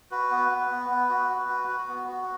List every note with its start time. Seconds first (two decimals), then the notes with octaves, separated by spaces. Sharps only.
0.11 F#4 B4
0.31 B3
0.50 B3
0.70 B3
0.90 B3
1.09 F#4
1.29 F#4
1.49 F#4
1.68 F#4
1.88 B3
2.08 F#4